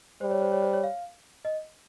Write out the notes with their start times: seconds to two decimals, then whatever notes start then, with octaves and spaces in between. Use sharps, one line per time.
0.21 G3 C5
0.31 C#5
0.42 C5
0.52 C#5
0.62 C5
0.73 C#5
0.84 F5
1.45 D#5